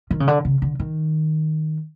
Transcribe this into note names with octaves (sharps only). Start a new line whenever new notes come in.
D#3
C#3
D3
C#3
D3
D#3